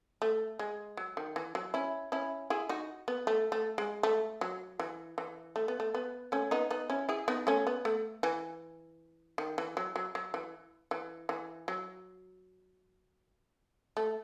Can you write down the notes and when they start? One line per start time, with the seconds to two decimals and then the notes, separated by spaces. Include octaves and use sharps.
0.22 A3
0.59 G#3
0.97 F#3
1.17 D#3
1.36 E3
1.55 F#3
1.74 C#4 E4
2.12 C#4 E4
2.50 E4 G#4
2.69 D#4 F#4
3.08 B3
3.27 A3
3.52 A3
3.78 G#3
4.03 A3
4.41 F#3
4.79 E3
5.18 E3
5.56 A3
5.68 B3
5.80 A3
5.94 B3
6.32 A3 C#4
6.51 B3 D#4
6.70 B3 D#4
6.90 C#4 E4
7.09 E4 G#4
7.28 B3 D#4
7.47 A3 C#4
7.67 B3
7.85 A3
8.23 E3
9.38 D#3
9.58 E3
9.77 F#3
9.96 F#3
10.15 F#3
10.34 E3
10.91 E3
11.29 E3
11.68 F#3
13.97 A3